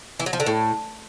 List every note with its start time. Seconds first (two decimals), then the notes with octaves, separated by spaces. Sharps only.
0.20 E3
0.26 F#3
0.33 F3
0.40 D3
0.46 A2